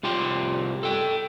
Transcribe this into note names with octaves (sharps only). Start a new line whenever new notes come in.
C2 F4 G4 G5 C6
A4 G5